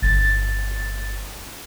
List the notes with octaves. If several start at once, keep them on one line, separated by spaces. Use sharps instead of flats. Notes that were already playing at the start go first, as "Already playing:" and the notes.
G1 A6